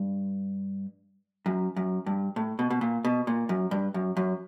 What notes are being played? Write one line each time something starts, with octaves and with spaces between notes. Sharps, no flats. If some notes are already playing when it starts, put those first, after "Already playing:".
Already playing: G2
F#2
F#2
G2
A2
B2
B2
A#2
B2
A#2
F#2
G2
F#2
F#2